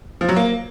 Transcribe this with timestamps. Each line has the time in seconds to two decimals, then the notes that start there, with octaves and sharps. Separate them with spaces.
0.21 F3
0.29 F#3
0.36 A#3